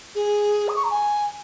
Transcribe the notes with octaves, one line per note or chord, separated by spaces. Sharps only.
G#4
D#6
C#6
A#5
G#5